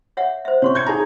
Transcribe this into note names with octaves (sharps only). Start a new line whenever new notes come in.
C#5 E5 F#5
C5 E5
C3 C#5 C6 C#6
G6 G#6 C#7
D#4 G#4 G#5 A#5